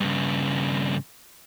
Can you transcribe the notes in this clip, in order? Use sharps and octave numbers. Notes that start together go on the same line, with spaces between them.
G2 C#3